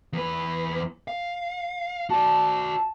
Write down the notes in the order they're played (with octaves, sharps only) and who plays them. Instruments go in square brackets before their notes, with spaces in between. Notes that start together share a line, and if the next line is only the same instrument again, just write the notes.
[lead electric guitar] E2 B4
F5
[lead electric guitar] F#4 D5 [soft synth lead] A5